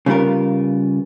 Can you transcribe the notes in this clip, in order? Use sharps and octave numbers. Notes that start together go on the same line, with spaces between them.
C#3 G3 B3 F4 A#4